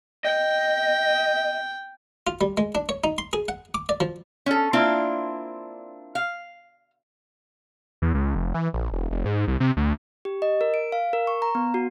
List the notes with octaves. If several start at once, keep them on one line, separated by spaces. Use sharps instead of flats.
D#5 G5
F4
G3
G#3
D4
C#5
D#4
C6
G#4
F#5
D6
D5
F3
C#4 A4
A#3 C4 D4 E4 F4
F5
E2
C#2
F1
E3
A#1
E1
F1
G#2
C2
C3
D2
G4
D#5
A#4
D7
F5
A#4
C#6
A#5
B3
F#4